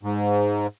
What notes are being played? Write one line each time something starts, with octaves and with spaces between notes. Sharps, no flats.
G#2